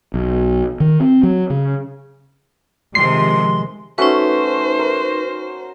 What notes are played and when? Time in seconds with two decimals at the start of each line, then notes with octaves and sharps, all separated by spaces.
0.14 B1
0.80 D#3
1.00 C4
1.23 F#3
1.50 C#3
2.95 C3 D#3 F3 G#3 C6 C7
3.98 A3 C#4 D#4 F#4 B4 C5
4.79 A#4